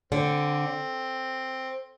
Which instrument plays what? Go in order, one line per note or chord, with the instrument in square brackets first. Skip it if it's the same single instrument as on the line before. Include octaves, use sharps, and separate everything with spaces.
[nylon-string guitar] D3 [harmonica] C4